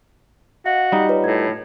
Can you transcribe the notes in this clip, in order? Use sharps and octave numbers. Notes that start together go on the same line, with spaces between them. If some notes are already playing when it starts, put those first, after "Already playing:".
F#4 D#5 F5
G3 D#4
F4 B4 C#5
A2 G#6